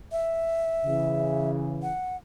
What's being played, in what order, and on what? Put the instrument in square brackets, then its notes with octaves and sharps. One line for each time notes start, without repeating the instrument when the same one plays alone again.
[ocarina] E5
[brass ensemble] C#3 E3
[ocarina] F#5